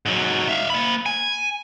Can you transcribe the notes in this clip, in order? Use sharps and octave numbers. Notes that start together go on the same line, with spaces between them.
G#2 F#3
E5 F5
A#3 B5
G#5